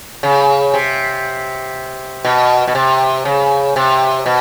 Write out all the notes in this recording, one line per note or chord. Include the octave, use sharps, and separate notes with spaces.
C#3
C3
B2
B2
C3
C#3
C3
B2